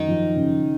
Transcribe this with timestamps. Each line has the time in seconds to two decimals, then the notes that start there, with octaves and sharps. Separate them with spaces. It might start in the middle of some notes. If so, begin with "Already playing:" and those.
Already playing: F#2 D#3 D#4
0.08 F3
0.36 C#3